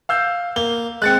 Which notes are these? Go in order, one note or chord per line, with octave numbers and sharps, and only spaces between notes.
F5 E6 G6
A#3 G7
G#3 C4 F#6 A6 C#7